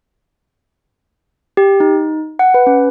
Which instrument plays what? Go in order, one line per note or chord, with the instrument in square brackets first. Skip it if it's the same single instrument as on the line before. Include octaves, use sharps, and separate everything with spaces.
[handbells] G4
D#4
F#5
B4
C#4